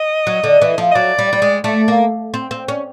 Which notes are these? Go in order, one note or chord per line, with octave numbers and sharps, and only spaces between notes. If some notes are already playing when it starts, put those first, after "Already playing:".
Already playing: D#5
F#3
D3
E3
F3
D#5
F#3 D5
G3
G3
G#3
A3 D5
A#3
C4
C4
C#4